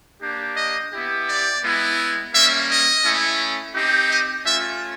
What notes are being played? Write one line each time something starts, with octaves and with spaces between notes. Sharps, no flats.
A#3 D4 G4
D#5
B3 E4 G4
D5
G#3 B3 E4
G3 A#3 C#4 E5
D#5
A3 C#4 E4
C4 D#4 G4
D#5
A3 C#4 F4 E5